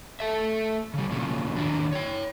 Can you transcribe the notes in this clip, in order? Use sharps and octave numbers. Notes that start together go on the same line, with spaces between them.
A3 A4 E5
C#3 G3
A#2 C#3 F3 F#3
D#3 F#3 D4
C#5 G5